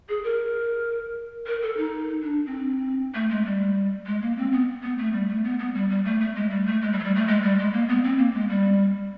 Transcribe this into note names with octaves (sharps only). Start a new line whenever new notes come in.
G#4
A#4
A#4
A4
D#4
D4
C4
A3
G#3
G3
G#3
A#3
C4
B3
B3
A3
G3
A3
B3
B3
G3
G3
A3
A3
G#3
G3
A3
G#3
G3
F#3
G3
A3
G#3
G3
G#3
A#3
B3
C4
A#3
G#3
G3